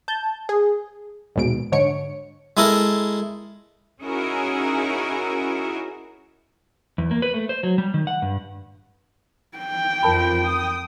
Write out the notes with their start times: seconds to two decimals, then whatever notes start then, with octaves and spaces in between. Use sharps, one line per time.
0.08 A5 G6
0.49 G#4
1.36 A#1 D#2 G#2 B2 D7
1.72 G#2 D3 C#5 C#7 D7
2.57 G#3 E4 A4 A#4
4.02 C#4 D#4 E4 F#4 G#4 A#4
6.98 E2
7.11 A#3
7.22 B4
7.34 A3
7.49 C5
7.63 F#3
7.78 G3
7.94 D#3
8.07 F#5
8.22 G2
9.58 G5
10.03 F2 F3 A#4 A5 B5
10.44 D#6